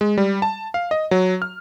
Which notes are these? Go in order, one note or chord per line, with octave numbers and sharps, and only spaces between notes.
G#3
G3
A5
F5
D#5
F#3
F6